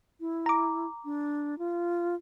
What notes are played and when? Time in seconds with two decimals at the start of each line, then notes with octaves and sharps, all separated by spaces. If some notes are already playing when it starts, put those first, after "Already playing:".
0.20 E4
0.46 A#5 D6
1.05 D4
1.59 F4